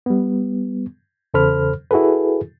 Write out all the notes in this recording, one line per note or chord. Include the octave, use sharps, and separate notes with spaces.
G3 B3
E2 C#3 A4 C5 B5 F6
E4 F#4 G#4 A4 B4